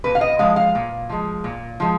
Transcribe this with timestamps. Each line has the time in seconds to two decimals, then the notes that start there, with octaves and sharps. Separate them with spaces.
0.04 A#2 B4
0.15 F5
0.21 D#5
0.39 F3 G#3 F5
0.56 F5
0.75 A#2
1.09 F3 G#3
1.44 A#2
1.80 F3 G#3